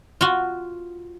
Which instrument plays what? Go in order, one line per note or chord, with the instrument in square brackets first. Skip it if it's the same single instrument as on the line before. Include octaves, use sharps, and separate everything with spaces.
[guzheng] F4 F#4